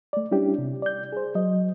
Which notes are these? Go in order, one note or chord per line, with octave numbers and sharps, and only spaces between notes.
A3 D5
G3 C#4 D4 E4 G4
C3
D5 G6
G#4 C5
F#3 D#5